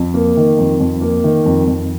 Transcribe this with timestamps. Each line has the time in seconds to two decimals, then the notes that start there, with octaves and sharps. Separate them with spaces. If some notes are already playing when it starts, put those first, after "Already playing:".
Already playing: F2
0.14 A#3
0.37 D#3
0.59 F2
0.80 F2
1.02 A#3
1.24 D#3
1.46 F2
1.68 F2